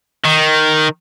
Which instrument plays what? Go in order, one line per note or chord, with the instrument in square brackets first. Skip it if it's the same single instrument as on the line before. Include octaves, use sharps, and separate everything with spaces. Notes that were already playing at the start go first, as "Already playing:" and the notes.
[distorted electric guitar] D#3